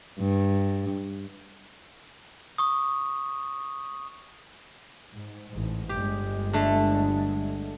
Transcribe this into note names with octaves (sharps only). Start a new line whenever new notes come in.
G2
C#6 D#6
G#2
A1 G#2
G1 G#3 G4
D3 A3